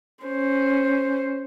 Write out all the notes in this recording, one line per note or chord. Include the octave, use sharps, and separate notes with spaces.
C#4 C5